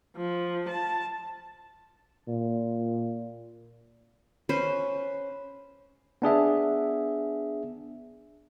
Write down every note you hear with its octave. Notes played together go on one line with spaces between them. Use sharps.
F3
A5
A#2
C#4 B4 C5
B3 D4 G#4 E5